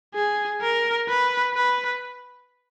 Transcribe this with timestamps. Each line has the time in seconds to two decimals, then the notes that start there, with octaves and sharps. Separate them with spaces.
0.15 G#4
0.62 A#4
1.08 B4
1.54 B4